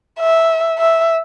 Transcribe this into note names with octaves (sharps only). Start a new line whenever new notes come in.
E5
E5